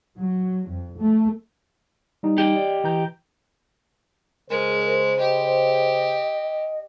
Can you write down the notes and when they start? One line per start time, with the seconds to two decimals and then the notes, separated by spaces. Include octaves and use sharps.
0.17 F#3
0.67 F2
0.98 A3
2.23 G3 D#4
2.38 G4 D#5
2.56 D5
2.84 E3 A#5 G6
4.50 C#3 G#3 A#4 C5
5.19 G4 D#5